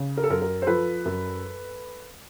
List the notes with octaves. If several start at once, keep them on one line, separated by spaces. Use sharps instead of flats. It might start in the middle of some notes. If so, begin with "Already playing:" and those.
Already playing: C#3
A#4
A4
F#2 A#4
A#4
C5
F3 A4 B4
F#2